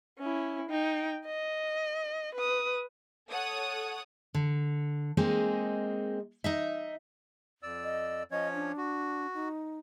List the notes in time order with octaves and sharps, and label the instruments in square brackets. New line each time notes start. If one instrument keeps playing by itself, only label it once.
[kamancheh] C#4 E4
D#4 G5
D#5
B4 D#6
[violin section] A4 C#5 F#5 D#6
[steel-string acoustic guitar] D3
G#3 A#3 C4 D#4 G#4
D#4 D#5 E5
[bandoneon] F2 D5 E6
[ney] D#5
[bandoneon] F3 C#4 C#5 [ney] D#5
[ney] D4
[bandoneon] F#4
[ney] D#4